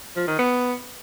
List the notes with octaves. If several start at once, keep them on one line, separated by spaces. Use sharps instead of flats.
F3
D#3
B3